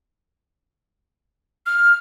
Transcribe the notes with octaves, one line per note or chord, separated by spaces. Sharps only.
F6